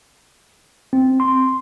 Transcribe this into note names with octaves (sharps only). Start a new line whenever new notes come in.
C4
C6